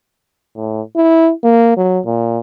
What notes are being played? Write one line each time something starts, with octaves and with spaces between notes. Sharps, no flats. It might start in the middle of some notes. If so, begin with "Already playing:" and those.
A2
E4
A#3
F#3
A#2